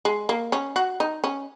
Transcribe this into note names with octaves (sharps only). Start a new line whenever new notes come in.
G#3
A#3
C#4
F#4
D#4
C#4